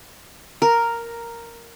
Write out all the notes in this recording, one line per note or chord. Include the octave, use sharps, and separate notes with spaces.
A#4